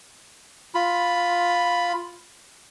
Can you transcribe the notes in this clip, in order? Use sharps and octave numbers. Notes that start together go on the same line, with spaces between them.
F4 B5